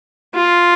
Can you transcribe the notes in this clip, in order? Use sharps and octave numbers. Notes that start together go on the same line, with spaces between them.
F4